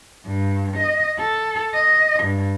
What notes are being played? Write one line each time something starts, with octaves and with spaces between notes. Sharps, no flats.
G2
D#5
A4
D#5
G2